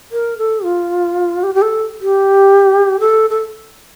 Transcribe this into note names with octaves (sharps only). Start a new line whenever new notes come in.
A#4
A4
F4
G4
G4
A4
G4
A4
A4